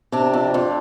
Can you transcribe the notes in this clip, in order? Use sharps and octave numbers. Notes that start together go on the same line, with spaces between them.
C3 D4
F2
F2